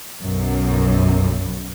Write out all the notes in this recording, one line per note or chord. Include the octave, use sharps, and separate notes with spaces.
B1 F#2